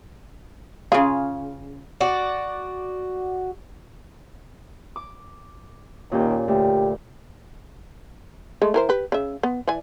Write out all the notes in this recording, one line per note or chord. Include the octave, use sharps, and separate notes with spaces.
C#3 F4 G#4
F#4 D5
D6
D#2 A#2 C#4 G4
D2 G4
G#3 A3
E3 A#4 C5
G4 B4
C#3 E5
B3
E3 D5 G#5